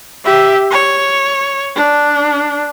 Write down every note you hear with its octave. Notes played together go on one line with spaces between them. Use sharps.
G4 E5
C#5
D4